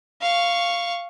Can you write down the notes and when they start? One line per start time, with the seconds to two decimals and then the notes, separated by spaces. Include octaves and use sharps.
0.21 F5 C#6